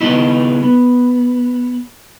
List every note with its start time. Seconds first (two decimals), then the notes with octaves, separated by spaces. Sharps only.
0.01 C#3 B3 D#4 E4
0.63 B3